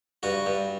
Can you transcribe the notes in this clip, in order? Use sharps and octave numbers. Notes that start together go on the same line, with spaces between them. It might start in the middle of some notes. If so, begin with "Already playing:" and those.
G2 F#4
G2